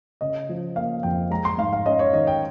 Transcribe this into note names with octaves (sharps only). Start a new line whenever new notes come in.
C#3 D#5
F3
A#3 F5
F2 G5
G#3 A#5
C6
G#2 F5
F5
C#4 D#5
C#5
D#3 D#5
G5